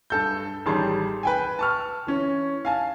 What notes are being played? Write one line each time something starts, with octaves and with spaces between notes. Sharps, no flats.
G2 A4 G6
A1 D#3 G3 G#4 A5 C6
B4 G5 G#5
A5 C#6 F6
E3 C#4
F5 G#5 A5